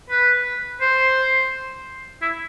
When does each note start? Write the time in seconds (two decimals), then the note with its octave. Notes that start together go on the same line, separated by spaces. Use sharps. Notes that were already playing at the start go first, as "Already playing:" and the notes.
0.10 B4
0.81 C5
2.22 E4